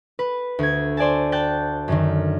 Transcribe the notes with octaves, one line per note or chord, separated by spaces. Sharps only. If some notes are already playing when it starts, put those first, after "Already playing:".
B4
D2 G#6
C5 D5 G#5 A5
G5 A5 F#6 G6
F#2 D3 D#3